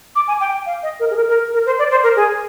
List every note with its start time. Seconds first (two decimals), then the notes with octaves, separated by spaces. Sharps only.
0.16 D6
0.28 G#5
0.41 G5
0.66 F5
0.83 D#5
1.00 A#4
1.11 G#4
1.16 A#4
1.29 A#4
1.54 A#4
1.66 C5
1.79 D5
1.91 C5
2.03 A#4
2.16 G#4